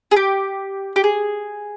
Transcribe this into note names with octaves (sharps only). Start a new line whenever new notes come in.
G#4
G4
G4
G#4